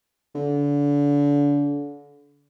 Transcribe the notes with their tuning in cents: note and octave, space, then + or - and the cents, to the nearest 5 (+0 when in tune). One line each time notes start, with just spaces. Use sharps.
D3 -30